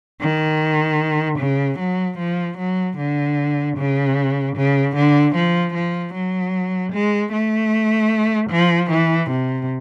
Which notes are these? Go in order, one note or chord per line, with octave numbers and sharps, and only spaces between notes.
D#3
C#3
F#3
F3
F#3
D3
C#3
C#3
D3
F3
F3
F#3
G#3
A3
F3
E3
C3